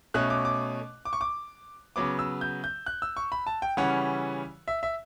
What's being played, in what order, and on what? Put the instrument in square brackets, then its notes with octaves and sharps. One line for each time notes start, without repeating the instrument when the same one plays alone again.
[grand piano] B2 A3 C#4 F#6
D6
D6
D6
C#6
D6
C#3 F#3 B3 D6
E6
G6
G6
F#6
E6
C#6
B5
A5
G5
C#3 E3 G3 C#4 F#5
E5
E5